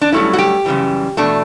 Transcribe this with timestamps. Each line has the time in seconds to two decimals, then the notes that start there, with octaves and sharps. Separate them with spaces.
0.01 D4
0.12 G2 F#3 A3 C#4 E4
0.33 F#4
0.38 G4
0.65 F#2 C#3 E3 G3
1.17 E2 B2 A3 D4